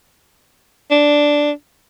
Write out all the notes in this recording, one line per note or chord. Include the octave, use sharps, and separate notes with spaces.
D4